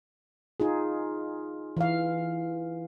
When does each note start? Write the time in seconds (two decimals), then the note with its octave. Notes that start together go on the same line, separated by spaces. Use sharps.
0.60 D#4 F4 G#4
1.77 E3 F5